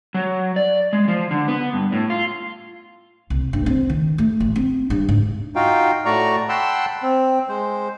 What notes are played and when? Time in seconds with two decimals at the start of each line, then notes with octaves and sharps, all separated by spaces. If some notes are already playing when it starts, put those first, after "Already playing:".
0.14 F#3
0.56 D5
0.93 G#3
1.08 F3
1.31 D3
1.48 B3
1.73 G2
1.92 A2
2.10 F4
3.30 C2
3.53 G2
3.66 C4
3.90 D#3
4.18 A3
4.40 A1
4.56 C4
4.90 G2
5.09 G#2
5.56 D#4 F4 F#4 F5 G5
6.05 A2 A3 F#4 D5 A#5 C#6
6.49 F#5 G5 A5 B5 C6 E6
7.03 C4
7.49 G#3 C5